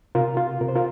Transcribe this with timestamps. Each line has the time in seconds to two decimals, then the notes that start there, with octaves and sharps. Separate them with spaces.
0.15 C3 F4 A#4
0.37 F4
0.60 C3 A#4
0.68 C5
0.75 F4 A#4